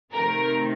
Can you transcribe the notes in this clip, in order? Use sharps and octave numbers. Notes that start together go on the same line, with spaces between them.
C3 D#3 A3 C4 A#4